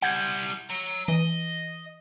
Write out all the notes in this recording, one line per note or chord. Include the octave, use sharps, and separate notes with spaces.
G3 E4 F#5 G6 G#6
C#5 A#5
E3 D#5